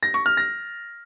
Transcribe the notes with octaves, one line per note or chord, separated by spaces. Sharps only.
A#6
C#6
F6
A#6